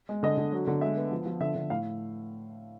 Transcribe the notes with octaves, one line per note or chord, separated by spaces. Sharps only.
G#3
D3 D#5
D3
F#3
D3
G#3 E5
B3
F3
F3
D3 E5
D3
A2 F5